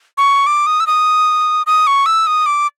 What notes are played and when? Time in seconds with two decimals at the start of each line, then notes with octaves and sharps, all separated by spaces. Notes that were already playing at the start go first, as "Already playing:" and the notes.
0.18 C#6
0.47 D6
0.67 D#6
0.80 E6
0.87 D#6
1.67 D#6
1.87 C#6
2.06 E6
2.27 D#6
2.46 D6